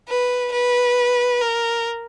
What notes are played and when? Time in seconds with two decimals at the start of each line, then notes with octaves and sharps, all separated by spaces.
0.09 B4
0.52 B4
1.41 A#4